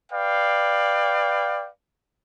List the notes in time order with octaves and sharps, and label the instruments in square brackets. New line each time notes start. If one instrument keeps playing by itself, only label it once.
[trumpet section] B4 D5 F5 G5